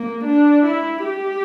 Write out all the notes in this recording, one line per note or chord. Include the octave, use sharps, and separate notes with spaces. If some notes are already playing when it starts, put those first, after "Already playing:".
Already playing: A#3
D4
E4
G4